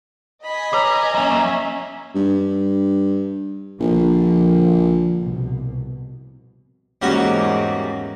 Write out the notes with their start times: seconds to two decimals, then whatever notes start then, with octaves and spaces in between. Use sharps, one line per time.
0.44 D#5 G#5 B5
0.73 G#4 B4 C#5 A#5 D6
1.14 F#3 A#3 C#4 E5
2.15 G2
3.80 A#1 D3 F3
5.22 C2 B2
7.02 E2 G#2 G3 A#3 C#4 F#4